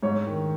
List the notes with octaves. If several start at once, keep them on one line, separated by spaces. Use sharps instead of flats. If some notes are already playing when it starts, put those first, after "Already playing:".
G#2 C#5
D#3